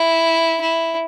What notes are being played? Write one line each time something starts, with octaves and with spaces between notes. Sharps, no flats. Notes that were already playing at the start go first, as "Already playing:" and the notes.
Already playing: E4
E4